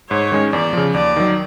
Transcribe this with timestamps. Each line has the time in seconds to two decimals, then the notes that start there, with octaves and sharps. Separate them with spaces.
0.10 G#2 C#5
0.32 D#3 G#3 C#4
0.52 E2 D5
0.73 C#3 F3
0.94 D#2 D5
1.16 D#3 F#3